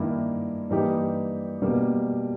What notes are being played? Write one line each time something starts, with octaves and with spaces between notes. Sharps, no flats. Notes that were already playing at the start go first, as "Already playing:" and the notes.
Already playing: G2 D#3 A#3 E4
G2 E3 A#3 D#4 G4
B2 G3 A#3